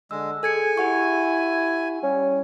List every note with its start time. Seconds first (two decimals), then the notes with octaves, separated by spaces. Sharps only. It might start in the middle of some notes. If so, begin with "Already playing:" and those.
0.11 D3 G#3 E6
0.43 G#4 A4 G#5 G#6 C#7
0.77 E4 G4 F#5 C#6
2.03 G3 C#4